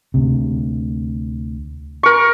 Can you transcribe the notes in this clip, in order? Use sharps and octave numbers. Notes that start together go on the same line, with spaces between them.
D2 C3
A#4 C#6